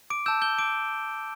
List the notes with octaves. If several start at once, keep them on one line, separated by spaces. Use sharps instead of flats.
D6 D7
A5 E6 G6 E7
G6 G7
D6 D7